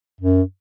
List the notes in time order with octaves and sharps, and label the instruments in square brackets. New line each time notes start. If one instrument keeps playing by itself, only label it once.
[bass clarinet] F#2